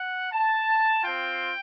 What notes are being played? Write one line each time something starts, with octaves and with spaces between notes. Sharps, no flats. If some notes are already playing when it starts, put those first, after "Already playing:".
Already playing: F#5
A5
C4 F4 G5